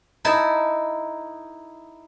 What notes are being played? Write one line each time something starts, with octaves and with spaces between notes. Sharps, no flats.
D#4 E4 A4 A5